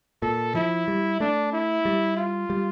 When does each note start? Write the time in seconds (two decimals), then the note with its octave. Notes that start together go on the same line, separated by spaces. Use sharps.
0.22 A#2 A4
0.55 F3 E4
0.88 G3
1.20 A3 D4
1.53 E4
1.85 G3
2.17 F4
2.50 G3